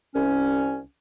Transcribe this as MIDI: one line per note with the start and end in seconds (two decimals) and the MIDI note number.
0.14 0.81 36
0.14 0.81 61